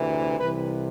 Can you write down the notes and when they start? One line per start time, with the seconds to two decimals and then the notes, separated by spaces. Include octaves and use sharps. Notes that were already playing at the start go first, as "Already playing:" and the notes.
Already playing: D2 C3 E3
0.38 C2 C3 E3 B4